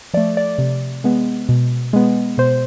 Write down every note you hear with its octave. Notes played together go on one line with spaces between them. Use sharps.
F3 A3 D5
D5
C3
G#3 B3
B2
G#3 B3
B2 C5